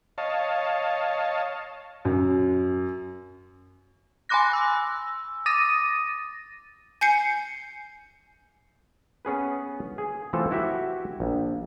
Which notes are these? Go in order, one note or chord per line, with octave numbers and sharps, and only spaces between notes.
C#5 D#5 F5 A5
F#2
G#5 B5 C6 D6 F#6 A#6
E6
D6 D#6 A6 A#6 D#7
G#5 G6 C7 C#7
B3 C#4 G#4 B4
G#4
E3 F3 A3 C4 F4 A4
E4 F#4 G4 E5
A#1